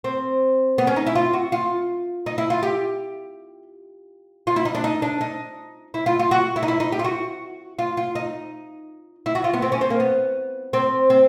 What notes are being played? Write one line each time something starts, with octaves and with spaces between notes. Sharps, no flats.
C4
B3
C#4
D#4
E4
F4
F#4
F4
D#4
E4
F4
G4
F4
E4
D#4
D4
D#4
D4
D#4
E4
F4
F4
F#4
E4
D#4
E4
D#4
G4
F4
F#4
F4
F4
D#4
E4
F#4
F4
B3
C4
C#4
C4
A#3
B3
C4
C4